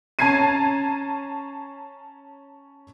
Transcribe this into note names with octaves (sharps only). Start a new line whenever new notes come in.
C#4 A5 A#5 G#6 C7 D#7